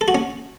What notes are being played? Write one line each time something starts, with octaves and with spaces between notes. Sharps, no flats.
A4
F#4
C#4